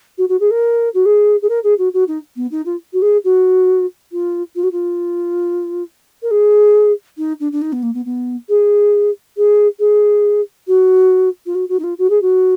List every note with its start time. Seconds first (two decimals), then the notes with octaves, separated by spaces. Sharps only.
0.18 F#4
0.29 F#4
0.40 G#4
0.51 A#4
0.94 F#4
1.06 G#4
1.42 G#4
1.49 A#4
1.64 G#4
1.78 F#4
1.94 F#4
2.08 D#4
2.36 B3
2.51 D#4
2.66 F4
2.93 F#4
3.02 G#4
3.24 F#4
4.12 F4
4.56 F4
4.63 F#4
4.72 F4
6.23 A#4
6.31 G#4
7.18 D#4
7.40 D4
7.52 D4
7.62 D#4
7.73 B3
7.83 A#3
7.94 B3
8.05 B3
8.49 G#4
9.37 G#4
9.79 G#4
10.67 F#4
11.46 F4
11.55 F#4
11.69 F#4
11.79 D#4
11.84 F4
11.99 F#4
12.10 G#4
12.22 F#4